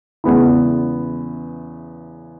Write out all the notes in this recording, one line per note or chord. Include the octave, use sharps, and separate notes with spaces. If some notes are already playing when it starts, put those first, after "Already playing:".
E2 C#3 G#3 B3 E4